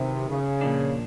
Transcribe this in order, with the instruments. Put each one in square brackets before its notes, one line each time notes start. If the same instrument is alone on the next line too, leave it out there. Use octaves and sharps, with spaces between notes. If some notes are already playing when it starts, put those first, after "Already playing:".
Already playing: [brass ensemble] C3 [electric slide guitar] D#3 F#3 B3 E4
[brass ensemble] C#3
[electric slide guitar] A#2 F3 A#3 D4